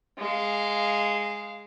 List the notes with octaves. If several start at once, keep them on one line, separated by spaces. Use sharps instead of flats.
G#3 F5